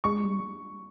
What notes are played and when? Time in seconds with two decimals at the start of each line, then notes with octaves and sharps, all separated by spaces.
0.04 G#3 C#6
0.24 G3